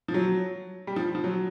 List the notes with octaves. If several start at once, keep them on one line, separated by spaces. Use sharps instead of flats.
F3
F#3
G3
F3
F3
F#3